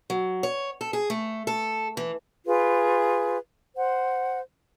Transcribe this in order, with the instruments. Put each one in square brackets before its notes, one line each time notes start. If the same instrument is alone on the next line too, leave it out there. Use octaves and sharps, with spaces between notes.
[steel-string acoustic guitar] F#3
C#5
A4
G#4
A3
A4
E3
[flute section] F4 G#4 B4
C5 F#5